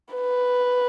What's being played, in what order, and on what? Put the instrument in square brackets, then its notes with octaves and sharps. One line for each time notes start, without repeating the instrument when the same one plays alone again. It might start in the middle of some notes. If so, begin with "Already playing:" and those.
[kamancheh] B4